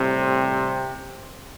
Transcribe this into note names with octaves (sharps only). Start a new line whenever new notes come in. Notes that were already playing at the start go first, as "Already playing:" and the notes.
Already playing: A2 C3 G3 C4